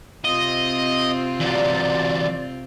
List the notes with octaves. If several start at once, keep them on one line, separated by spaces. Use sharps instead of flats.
C3 C4 F4 D#5
E3 F#3 D5